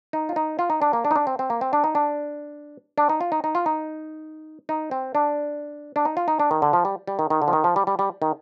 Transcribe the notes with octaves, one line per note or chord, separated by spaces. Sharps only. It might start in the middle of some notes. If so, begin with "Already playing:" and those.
D#4
F4
D#4
F4
D#4
D4
A#3
D4
D#4
D4
C4
C4
A#3
C4
D4
D#4
D4
D4
D#4
F4
D#4
D#4
F4
D#4
D#4
C4
D4
D4
D#4
F4
D#4
D4
D#3
D3
F3
G3
G3
D#3
D#3
D3
F3
D#3
F3
G3
G3
G3
D#3